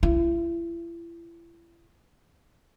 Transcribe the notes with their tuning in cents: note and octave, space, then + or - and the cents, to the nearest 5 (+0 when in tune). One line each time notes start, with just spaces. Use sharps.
E4 +35